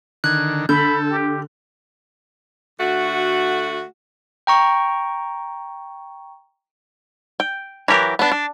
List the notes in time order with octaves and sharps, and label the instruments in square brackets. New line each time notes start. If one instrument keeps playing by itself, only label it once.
[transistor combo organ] D3 D#3 [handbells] F#6 G#6
[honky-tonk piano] D3 [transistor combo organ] A4 [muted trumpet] B5 [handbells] G6
[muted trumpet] G4
[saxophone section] D3 A3 F#4
[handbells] G5 A#5 C#6
[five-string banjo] G5
E3 F#3 G4 A#4
B3 D4
D4